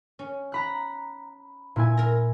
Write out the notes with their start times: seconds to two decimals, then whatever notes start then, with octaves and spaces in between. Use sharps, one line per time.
0.19 C#4
0.52 A#5 B5 F#6
1.76 A#2 E4 G#5
1.97 A#4 A#5